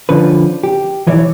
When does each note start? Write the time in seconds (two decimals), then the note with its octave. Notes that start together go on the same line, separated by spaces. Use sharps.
0.09 D3 F3 C#4 B4
0.63 G4
1.07 B1 E3 C#5 D5 E5